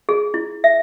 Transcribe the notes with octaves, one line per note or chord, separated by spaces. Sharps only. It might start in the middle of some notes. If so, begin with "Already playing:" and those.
G#4
E4
E5